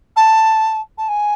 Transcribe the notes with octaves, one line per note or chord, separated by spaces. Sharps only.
A5
A5
G#5